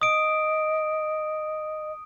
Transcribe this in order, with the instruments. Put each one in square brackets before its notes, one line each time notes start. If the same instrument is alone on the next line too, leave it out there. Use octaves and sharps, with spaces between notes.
[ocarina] D#5 [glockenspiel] D#6 D7